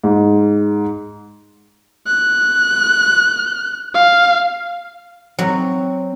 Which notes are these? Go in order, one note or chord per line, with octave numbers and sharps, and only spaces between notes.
G#2
F#6
F5
F#3 C4